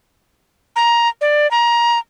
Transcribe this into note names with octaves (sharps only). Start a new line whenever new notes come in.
A#5
D5
A#5